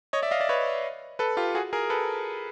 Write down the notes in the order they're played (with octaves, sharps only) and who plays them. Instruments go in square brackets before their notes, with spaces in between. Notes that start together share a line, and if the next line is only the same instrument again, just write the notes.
[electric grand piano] C#5 D#5
D5 E5
D#5 F5
D5 E5
B4 C#5
A4 B4
F4 G4
F#4 G#4
G#4 A#4
A4 B4